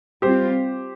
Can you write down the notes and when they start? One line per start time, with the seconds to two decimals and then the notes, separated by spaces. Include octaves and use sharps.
0.22 G3 C4 F4 G4 C5